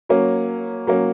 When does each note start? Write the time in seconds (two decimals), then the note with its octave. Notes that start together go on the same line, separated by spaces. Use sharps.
0.09 F#3 A#3 C#4
0.87 F#3 A#3 C#4